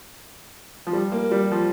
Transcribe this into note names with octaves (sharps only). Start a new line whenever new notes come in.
F3
G3
A#3
G3
F3